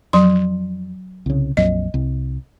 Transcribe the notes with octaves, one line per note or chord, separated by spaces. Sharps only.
F2 F#3 C6
C2 C#3
A#1 F2 F#3 D#5
C2